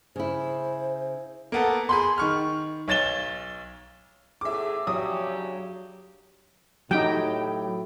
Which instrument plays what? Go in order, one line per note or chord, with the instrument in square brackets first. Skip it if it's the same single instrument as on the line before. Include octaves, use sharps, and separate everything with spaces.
[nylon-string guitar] C#3 E4 [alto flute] C5
[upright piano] A#3 B3 A4
G#4 B5 C6
D#3 C#6 F6
B1 C#5 A6 E7 G7
[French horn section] E2 A2 G#4 [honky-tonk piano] E5 D6
[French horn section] C#3 D4 G4 [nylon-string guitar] F#3 [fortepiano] D#6
[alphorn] A2 [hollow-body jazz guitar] F#3 G4 [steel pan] D#4 G5